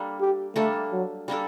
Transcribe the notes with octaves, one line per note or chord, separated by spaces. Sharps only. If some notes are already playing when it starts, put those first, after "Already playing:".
Already playing: G3 A#3 D4 A4
G4
G3 A3 A#3 D4 A4
F#3
G3 A#3 D4 A4